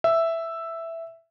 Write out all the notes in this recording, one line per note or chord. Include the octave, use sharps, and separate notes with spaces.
E5